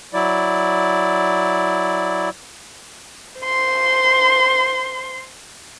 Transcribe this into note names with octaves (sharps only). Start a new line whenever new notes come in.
F#3 E4 D5
C5 C6